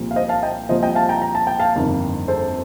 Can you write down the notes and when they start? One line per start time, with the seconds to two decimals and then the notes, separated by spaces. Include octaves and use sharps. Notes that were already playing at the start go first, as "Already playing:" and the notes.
Already playing: C2 A#2 F3 A#3
0.11 F5
0.16 C5 D#5
0.29 F5 A5
0.43 D#5 G5
0.69 C2 A#2 F3 C5 D#5
0.83 D#5 G5
0.95 F5 A5
1.09 G5 A#5
1.22 A#5
1.35 A5
1.47 G5
1.60 F5 A5
1.75 G1 F2 D#3 A#3
2.28 A4 C5